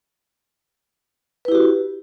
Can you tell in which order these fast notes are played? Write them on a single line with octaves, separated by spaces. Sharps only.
B4 E4 G4 F#4